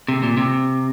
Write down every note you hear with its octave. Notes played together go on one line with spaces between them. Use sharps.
C3
A#2
C3